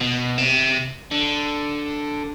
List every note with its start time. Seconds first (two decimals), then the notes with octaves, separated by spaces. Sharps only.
0.01 B2
0.38 C3
1.12 D3